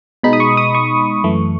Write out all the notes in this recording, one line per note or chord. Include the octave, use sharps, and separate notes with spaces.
B2 G#3 D#4 B5
D#6
C#6
D#6
C#6
F#2 E3 A3